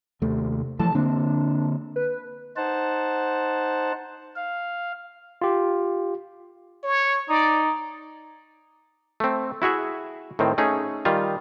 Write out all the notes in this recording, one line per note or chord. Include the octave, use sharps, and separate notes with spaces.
D#2 C3 A3
E3 F3 A3 A5
D3 A#3 C4 D4
B4
D#4 C5 F#5 A5
F5
F4 G4
C#5
D#4 D5
A3 C4
E4 F#4 G#4 E5
A2 D#3 C4
A3 C#4 D#4 G#4
D#3 G3 F4